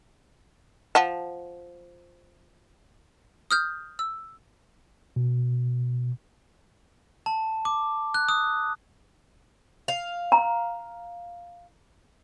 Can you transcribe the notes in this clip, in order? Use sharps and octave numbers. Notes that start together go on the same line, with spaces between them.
F3 F#5 A5
D#6 F6 G6
E6
B2
A5
D6
F#6
D#6
F5
A#5